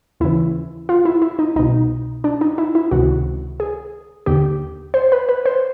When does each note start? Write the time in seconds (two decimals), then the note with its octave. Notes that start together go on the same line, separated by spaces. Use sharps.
0.20 D#2 C#3 E3 E4
0.89 F4
1.05 E4
1.22 E4
1.39 D#4
1.56 C2 B2 D#4
2.24 D4
2.41 D#4
2.58 E4
2.75 E4
2.91 C#2 C3 D#3 F#4
3.60 G#4
4.26 D#2 D3 G4
4.94 C5
5.12 B4
5.29 B4
5.46 C5